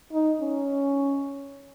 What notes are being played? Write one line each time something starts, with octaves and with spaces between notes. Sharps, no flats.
D#4
C#4